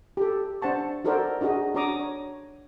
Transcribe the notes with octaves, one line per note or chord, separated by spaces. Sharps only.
G4 A4
D4 C5 F#5 A5 C#6
D#4 F#4 A4 A#4 C5 D5
D4 D#4 F#4 G#4 D#5
D4 F#4 C#5 A#5 D6 D#6
C#5